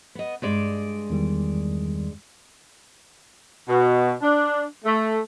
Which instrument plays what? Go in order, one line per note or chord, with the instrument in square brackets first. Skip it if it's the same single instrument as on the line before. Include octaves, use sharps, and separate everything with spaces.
[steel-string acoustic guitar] B3 D#5
G2 G#3 D5
[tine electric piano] E2 D#3 G3
[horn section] B2
D4
A3